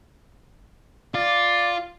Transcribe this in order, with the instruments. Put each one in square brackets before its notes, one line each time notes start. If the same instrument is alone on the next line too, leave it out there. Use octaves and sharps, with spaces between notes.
[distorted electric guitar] F4 [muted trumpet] D5